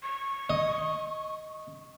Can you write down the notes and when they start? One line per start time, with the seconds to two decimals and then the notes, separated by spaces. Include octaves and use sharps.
0.03 C#6
0.50 D#5